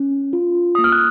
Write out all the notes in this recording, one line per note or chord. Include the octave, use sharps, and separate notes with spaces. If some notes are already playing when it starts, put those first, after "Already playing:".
Already playing: C#4
F4
A#3 D#6
F6
F#6